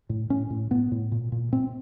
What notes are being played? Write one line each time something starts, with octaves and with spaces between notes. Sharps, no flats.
A2
A2 C#4
A2
A2 B3
A2
A#2
A#2
A#2 C4